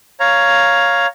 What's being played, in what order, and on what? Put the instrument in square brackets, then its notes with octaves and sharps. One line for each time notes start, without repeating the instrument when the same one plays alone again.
[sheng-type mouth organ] C#5 F5 A#5